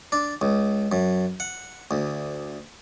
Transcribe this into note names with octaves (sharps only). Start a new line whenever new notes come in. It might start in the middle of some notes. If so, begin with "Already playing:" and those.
D4
C#2
F#2
F#5
D2